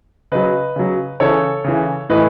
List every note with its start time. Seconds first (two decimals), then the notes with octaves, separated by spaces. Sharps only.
0.32 C#3 F#3 B4 D#5
0.76 C#3 F#3
1.20 C#3 E3 A4 C#5
1.64 C#3 E3
2.09 A2 E3 B4 D#5